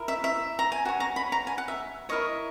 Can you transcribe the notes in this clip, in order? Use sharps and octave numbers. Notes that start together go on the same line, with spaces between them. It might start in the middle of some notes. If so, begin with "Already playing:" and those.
Already playing: E4 A#4
E5
E5
A#5
G#5
F#4 C#5 F#5
A#5
B5
A#5
G#5
F#5
E5
E4 A#4 C#5 D#5